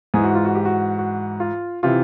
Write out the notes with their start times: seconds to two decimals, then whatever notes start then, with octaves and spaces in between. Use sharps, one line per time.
0.14 G#2 E3 G#4
0.24 F#4
0.35 F4
0.45 F#4
0.55 G4
0.65 F#4
0.98 F#4
1.40 F4
1.83 C3 E3 F4